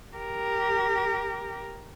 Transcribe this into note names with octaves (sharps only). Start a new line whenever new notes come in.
G4 A#4